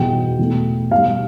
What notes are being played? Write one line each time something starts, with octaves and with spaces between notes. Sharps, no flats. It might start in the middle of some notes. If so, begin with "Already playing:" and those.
Already playing: E2 B2 G3 G5
E2 B2 A3
B2 G3 F5